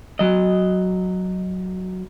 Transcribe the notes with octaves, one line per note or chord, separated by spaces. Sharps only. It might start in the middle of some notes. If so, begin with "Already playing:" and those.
F#3 D#5